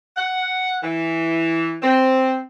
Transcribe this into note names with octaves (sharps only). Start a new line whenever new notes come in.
F#5
E3
C4